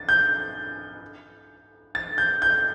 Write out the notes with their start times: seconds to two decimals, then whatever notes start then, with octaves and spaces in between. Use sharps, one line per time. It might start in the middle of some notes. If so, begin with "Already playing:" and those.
Already playing: A6
0.09 G6
1.95 A6
2.18 G6
2.42 G6